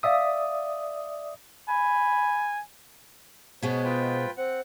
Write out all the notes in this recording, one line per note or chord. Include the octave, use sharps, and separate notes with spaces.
D5 E5 F5 D#6 E6
G#5 B5
B2 G#3 B3 C5 C#5
F4 B4 G5
C4 C5 F#5